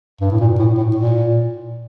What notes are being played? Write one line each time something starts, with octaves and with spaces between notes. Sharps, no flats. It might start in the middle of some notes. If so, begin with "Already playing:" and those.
G2
A2
A#2
A2
A2
A#2